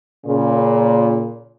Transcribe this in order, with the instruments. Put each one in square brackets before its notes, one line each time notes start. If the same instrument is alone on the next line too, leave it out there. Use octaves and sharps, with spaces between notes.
[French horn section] A#2 C#3